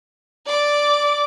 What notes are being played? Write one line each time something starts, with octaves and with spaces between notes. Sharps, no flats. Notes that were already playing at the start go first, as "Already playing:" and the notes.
D5 D6